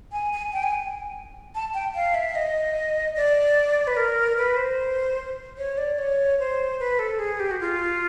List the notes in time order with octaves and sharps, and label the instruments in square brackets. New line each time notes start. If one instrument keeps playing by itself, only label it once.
[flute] G#5
G#5
G5
G#5
A5
G5
F5
E5
D#5
D5
B4
A#4
B4
C5
C#5
D5
C#5
C5
B4
A4
G#4
G4
F#4
F4